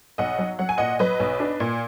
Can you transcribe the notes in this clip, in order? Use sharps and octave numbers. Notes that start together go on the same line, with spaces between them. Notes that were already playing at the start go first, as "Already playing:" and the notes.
B1 D#5 F#5
F#3
F#3 F#5
G#5
A#2 D#5 F#5
F#3 B4 D#5
B1
D4
A#2